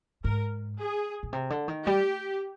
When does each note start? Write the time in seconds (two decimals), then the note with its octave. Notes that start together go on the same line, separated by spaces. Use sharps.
0.24 G#2 A#4
0.78 G#4
1.23 A#2
1.33 C3
1.50 D3
1.68 D#3
1.86 G3 G4